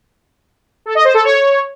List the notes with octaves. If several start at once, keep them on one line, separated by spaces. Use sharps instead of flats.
A4
D#5
C5
A4
C#5